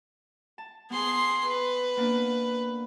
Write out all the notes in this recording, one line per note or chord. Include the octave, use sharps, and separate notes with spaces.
A5
B3 G#4 C6
B4
A#3 B3 D4